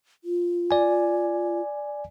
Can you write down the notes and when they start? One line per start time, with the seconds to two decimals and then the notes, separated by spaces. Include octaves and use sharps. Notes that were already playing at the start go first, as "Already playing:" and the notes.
0.24 F4
0.71 D5 G#5